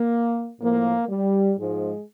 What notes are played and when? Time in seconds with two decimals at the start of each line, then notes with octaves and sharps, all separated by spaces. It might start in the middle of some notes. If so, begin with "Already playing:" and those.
Already playing: A#3
0.60 A2 F3 A#3
1.09 G3
1.58 G#2 F3 G#3